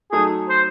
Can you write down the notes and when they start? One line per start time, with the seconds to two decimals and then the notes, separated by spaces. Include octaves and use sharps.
0.12 F#3 A3 D#4 G#4 A4
0.50 C5